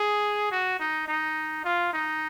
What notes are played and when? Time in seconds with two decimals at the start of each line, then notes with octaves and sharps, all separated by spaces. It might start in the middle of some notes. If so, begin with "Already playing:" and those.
Already playing: G#4
0.52 F#4
0.80 D#4
1.08 D#4
1.65 F4
1.93 D#4